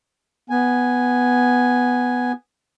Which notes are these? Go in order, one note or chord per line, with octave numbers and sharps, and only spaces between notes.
B3 G#5